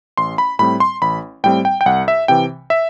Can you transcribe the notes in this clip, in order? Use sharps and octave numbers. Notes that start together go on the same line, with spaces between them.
A1 C6
B5
A2 G3 C4 B5
C6
A1 B5
A2 G3 C4 G5
G5
G5
C2 F#5
E5
C3 E3 G5
E5